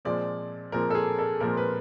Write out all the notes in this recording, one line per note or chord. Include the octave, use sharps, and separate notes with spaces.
A#2 F3 G#3 C4 D5
A#2 F3 G#3 C4 A#4
A4
G#4
A4
A#2 F3 G#3 C4 A#4
B4